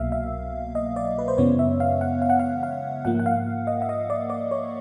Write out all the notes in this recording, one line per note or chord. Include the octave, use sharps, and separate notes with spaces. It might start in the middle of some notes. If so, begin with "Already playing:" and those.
Already playing: C2 B2 F#3 A#3 E5 F5
E5
D#5
D5
B4
C5
F#2 C#3 E3 G#3 B3 C#5
E5
F5
F#5
F5
F#5
F5
F5
G#2 F3 A#3 F#5
F#5
F5
D#5
E5
D#5
D5
D5
C#5